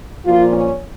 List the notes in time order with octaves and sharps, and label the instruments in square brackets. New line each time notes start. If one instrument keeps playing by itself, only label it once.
[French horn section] A#2 F3 F4
C#4